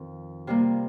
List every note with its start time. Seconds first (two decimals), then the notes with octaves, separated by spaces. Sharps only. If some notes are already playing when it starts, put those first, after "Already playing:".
Already playing: F2 D#3 F4
0.47 C3 G3 A#3 F4